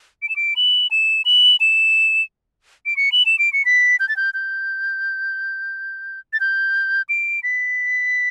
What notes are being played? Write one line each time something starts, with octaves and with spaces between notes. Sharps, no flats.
D7
E7
D7
F#7
E7
F#7
E7
D7
C#7
F#7
E7
D7
C#7
B6
G6
A6
G6
G6
A6
G6
D7
B6